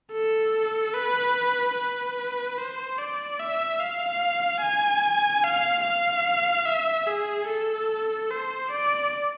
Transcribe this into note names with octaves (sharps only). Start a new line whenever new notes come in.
A4
B4
B4
C5
D5
E5
F5
G#5
F5
F5
E5
G#4
A4
C5
D5